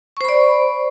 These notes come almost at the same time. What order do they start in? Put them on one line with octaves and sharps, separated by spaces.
C#6 C5 B5 D5